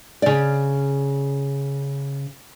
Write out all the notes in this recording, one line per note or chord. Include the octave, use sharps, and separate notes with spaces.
C#3 D5